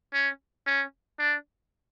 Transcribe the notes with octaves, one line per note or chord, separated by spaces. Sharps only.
C#4
C#4
D4